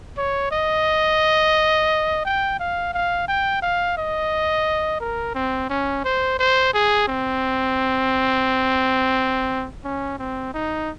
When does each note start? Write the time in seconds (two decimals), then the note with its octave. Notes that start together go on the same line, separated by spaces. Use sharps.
0.18 C#5
0.52 D#5
2.25 G5
2.59 F5
2.94 F5
3.28 G5
3.62 F5
3.97 D#5
5.00 A#4
5.35 C4
5.70 C#4
6.05 C5
6.39 C5
6.74 G#4
7.08 C4
9.85 C#4
10.19 C4
10.54 D#4